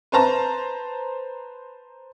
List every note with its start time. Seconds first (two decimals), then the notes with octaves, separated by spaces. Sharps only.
0.12 B4 C5 A5 A#5